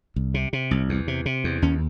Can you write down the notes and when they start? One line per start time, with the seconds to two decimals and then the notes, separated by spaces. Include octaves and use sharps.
0.16 C2
0.34 C3
0.53 C3
0.71 C2
0.89 E2
1.08 C3
1.26 C3
1.44 E2
1.62 D#2 C#4